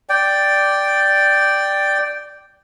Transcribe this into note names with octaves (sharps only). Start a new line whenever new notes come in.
D5 G5